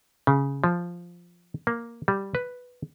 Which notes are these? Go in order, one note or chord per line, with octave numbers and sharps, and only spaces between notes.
C#3
F3
A#3
G3
B4